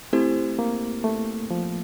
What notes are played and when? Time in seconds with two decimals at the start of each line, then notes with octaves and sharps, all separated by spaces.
0.13 A3 C4 E4 G4 C5
0.59 A#3
1.04 A3
1.51 F3